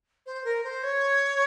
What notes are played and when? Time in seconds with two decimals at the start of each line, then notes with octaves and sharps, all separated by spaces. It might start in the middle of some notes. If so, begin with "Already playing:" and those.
0.26 C5
0.44 A#4
0.64 C5
0.83 C#5